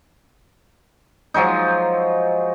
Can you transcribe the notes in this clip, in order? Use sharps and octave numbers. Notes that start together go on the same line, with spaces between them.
F3 F#3 G#3 D#4